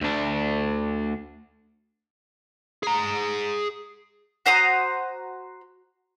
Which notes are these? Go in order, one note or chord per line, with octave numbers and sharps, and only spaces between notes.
D2 D4
G#4 A#5
F#4 C5 A#5 D#6